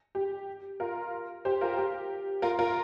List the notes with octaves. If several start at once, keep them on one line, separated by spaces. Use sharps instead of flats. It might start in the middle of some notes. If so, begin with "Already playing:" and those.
G4
F4 A#4
G4 C5
F4 A#4
G4
F4 A#4
F4 A#4